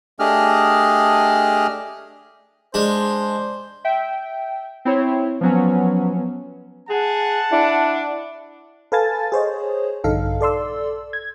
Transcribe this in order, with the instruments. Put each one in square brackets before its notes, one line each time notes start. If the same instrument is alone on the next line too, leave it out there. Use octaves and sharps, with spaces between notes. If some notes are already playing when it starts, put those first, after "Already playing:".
[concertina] A3 D4 G4 G#4 D#5 F6
[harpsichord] G#3 D4 [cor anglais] C5
[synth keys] E5 G5
C4 E4 C#5
[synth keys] F3 F#3 C#4 [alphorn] B3
[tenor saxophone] G#4 [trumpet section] F#5 A5
[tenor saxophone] D4 [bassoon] E4
[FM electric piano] A4 B4 F5 G#5 A5 A6
G#4 C5 C#5 D#5
A#1 G2 D3 D#4 A4 F5
A4 D5 C6 E6
G#6